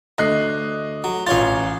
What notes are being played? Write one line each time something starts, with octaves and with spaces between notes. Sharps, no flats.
D2 D#5 F#6 C7
F#3
A1 F4 C#5 F5 A6